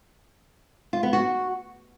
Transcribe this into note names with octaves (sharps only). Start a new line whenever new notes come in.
F4
B3
F#4